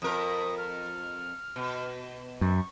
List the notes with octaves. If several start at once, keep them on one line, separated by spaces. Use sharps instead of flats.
F2 A#4 D#6
F6
B2
F#2 C#6